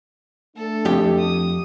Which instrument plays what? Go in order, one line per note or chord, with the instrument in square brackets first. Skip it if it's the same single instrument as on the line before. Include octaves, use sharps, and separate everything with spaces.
[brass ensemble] A3 D4 [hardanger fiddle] A4
[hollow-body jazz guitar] F2 G4
[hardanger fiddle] D#6